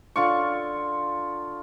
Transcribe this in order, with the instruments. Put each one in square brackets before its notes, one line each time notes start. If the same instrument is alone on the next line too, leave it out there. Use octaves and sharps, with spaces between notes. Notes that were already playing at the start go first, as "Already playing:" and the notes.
[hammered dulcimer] D3 F4 C#6